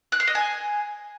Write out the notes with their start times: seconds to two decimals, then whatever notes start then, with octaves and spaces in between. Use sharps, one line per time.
0.12 F#6
0.20 C6
0.27 D#5
0.35 G#5